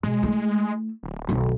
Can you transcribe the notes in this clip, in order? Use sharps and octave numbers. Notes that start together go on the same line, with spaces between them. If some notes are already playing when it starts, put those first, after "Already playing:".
B2 G#3
A3 E4
D1
B1 D#3